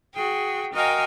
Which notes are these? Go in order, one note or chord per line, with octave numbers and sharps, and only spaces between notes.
F#4 G#4 G5
F#4 A#4 D#5 F5 G5 G#5